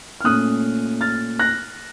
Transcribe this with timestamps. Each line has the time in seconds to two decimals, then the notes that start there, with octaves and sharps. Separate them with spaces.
0.21 F6
0.24 A#2 A3 C#4 D#6 F#6
1.01 F6 A6
1.39 F#6 A#6